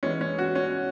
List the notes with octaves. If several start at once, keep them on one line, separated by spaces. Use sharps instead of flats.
E3 G#3 B3 C#4
C#4
F#4
C#4